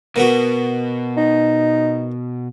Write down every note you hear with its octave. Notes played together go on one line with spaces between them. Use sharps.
B2 A#3 B3 F#4
D#4